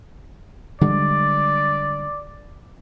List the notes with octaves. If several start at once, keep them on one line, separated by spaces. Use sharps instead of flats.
D3 G3 G#3 D5